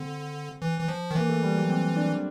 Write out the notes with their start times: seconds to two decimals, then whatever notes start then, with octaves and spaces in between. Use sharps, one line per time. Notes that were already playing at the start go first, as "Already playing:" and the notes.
Already playing: D3 C4
0.62 E3
0.80 E3
0.88 F3
1.11 D#3
1.15 E3 A#3
1.29 A3
1.43 G3
1.57 F#3
1.69 C4
1.97 D4